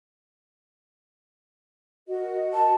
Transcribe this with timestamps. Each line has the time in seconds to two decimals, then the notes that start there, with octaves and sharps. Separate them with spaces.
2.08 F#4 A#4 D#5
2.53 A5